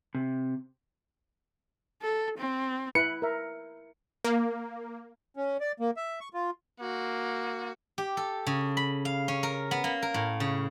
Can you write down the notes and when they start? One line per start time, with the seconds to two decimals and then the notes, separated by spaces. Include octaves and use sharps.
0.15 C3
2.02 A4
2.38 C4
2.95 E4 B4 C#7
3.22 A#4 E5
4.24 A#3
5.36 C#4
5.60 D5
5.80 A#3
5.97 E5
6.21 C#6
6.34 F4
6.80 A#3 F#4
7.98 G4
8.17 A4
8.47 C#3
8.77 B5
9.05 F5
9.28 C#4
9.43 A#4
9.71 B3
9.84 A#3
10.02 A#4
10.14 A2
10.40 C#3